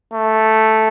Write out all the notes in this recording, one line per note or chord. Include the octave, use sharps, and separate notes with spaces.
A3